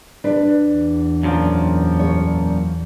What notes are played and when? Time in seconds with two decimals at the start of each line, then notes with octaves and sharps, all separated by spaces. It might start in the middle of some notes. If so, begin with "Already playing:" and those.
0.24 D4 B4
0.62 E2
1.23 F#2 A#2 F3
1.99 C#5